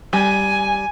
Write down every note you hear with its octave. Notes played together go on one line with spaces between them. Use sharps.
G3 G#5